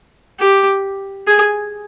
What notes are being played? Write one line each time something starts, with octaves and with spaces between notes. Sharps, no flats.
G4
G#4